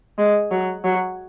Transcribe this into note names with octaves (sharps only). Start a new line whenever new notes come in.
G#3
F#3
F#3